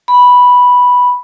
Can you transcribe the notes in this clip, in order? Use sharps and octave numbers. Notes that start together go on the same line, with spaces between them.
B5